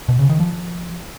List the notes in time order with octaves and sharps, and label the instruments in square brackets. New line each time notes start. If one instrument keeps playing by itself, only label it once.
[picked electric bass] B2
C#3
D#3
F3